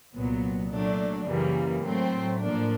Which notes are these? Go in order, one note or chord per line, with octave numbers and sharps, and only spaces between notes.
C2 A#2 F#3 B3
A#2 F#3 A3 D4
F#2 C#3 E3 G3 A#3
A2 F#3 A3 C4
A2 F3 A#3 D4